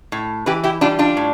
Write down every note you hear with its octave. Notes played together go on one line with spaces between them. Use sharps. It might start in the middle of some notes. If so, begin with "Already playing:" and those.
A2
E3 G4 B4
E4 G4
G3 D4 F4
D4 F4
A2